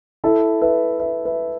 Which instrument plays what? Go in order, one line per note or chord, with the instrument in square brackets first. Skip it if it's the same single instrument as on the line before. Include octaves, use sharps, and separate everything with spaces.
[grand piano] E4 A4
B4 E5
B4 E5
B4 E5